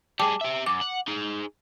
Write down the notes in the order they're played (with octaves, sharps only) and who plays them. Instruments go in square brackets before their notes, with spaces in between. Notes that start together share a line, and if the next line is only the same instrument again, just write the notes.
[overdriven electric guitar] G3 G#4 [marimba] G5 A5 D6
[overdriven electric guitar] G4 E5
[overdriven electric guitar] F#2 [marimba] D6
[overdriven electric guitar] F#5
D#4 G#4